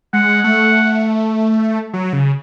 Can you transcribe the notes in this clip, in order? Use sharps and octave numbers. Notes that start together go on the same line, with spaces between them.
G#3 F#5
A3
F#3
C#3